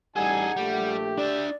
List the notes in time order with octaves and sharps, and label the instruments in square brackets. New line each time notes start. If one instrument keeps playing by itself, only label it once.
[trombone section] A1 G3 [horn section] D#4 G#5 [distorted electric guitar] G#4 A4 [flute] F#5
[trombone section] A#1 A3 [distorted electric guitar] G3 [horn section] G4
[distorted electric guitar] D4 E5 [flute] D5